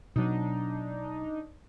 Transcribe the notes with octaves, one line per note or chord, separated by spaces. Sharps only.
B2 F#3 D4 D#4